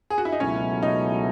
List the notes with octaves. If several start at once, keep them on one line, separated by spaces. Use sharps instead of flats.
G#4
F#4
E4
D#4
C#2 B2 F#3 A3 C#4 E4
D#4